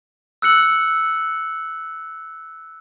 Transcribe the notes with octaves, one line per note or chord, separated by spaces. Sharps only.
E6 F#6 C#7 F#7